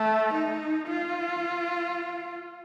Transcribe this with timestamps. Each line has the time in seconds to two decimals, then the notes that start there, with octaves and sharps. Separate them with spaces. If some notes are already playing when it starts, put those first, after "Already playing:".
Already playing: A3
0.34 D#4
0.88 F4